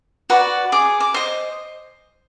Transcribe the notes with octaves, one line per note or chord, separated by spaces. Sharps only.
F#4 B4 D5
G#4 D6
D6
C5 D#5